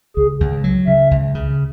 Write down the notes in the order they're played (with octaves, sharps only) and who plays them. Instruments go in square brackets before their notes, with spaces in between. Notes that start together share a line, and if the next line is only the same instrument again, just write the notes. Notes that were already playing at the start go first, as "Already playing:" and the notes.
[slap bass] C#2 [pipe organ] G#4
[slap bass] C#2
F#3
[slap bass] C#3 [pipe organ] E5
[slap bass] C#2
C#3